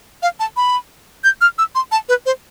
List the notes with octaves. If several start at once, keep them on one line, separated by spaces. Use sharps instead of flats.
F5
A5
B5
G6
F6
E6
C6
A5
B4
C5